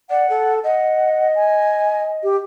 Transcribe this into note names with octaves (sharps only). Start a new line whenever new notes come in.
D5 F#5
A4
D#5 F#5
G#5
G4